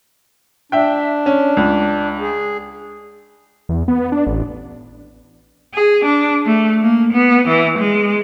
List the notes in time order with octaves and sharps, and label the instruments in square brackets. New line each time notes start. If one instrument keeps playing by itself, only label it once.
[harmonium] D4 [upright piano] E5 G5
[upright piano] C#4
C#2
[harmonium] G#4
[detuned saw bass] E2
B3
D4
A1
[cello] G#4
D4
A3
A#3
B3
E3
G#3